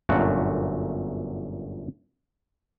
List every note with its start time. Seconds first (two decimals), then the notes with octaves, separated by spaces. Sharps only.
0.09 G1 F#2 A#2 A3 F#4 F#5